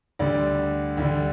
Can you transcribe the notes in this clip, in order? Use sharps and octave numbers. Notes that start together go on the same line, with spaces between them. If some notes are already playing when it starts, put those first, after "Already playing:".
D2 D3 G3 D5
D2 D3 G3